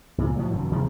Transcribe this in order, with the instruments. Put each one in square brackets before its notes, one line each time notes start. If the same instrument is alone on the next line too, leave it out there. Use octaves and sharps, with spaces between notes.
[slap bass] C#2 A#2
A2 F3 F#3
F1 F#2 D#3 F#3
D#2 C3 F3 G#3